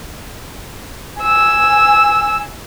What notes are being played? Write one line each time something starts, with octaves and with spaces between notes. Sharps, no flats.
G#5 E6